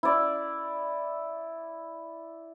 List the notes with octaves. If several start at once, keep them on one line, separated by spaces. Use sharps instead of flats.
E4 D5